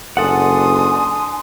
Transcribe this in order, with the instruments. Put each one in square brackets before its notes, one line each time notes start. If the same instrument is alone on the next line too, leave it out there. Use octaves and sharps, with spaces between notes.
[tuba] F#1 [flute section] D4 G#5 C6 [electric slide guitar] A4 F#5 [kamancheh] D#6